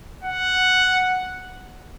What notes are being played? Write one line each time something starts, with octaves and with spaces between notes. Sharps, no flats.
F#5